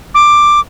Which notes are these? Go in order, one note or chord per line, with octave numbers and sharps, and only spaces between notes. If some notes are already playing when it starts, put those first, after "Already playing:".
D6